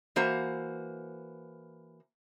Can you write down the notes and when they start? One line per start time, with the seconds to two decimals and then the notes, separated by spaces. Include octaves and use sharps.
0.16 E3 A#3 F#4 C5